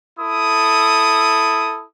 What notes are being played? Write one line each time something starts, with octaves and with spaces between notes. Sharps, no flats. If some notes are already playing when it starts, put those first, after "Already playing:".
E4 A4 D#6